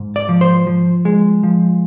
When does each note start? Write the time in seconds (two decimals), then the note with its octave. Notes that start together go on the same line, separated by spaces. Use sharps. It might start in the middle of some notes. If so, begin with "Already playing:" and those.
Already playing: G#2
0.16 D5
0.29 F3
0.41 C5
0.67 F3
1.05 G#3
1.43 F3